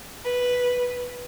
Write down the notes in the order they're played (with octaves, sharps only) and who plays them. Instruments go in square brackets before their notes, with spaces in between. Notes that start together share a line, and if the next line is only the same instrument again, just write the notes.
[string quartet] B4